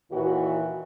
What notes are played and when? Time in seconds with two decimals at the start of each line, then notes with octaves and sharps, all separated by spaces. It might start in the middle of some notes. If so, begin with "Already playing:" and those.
0.11 D#2 A#2 E3 E4 F#4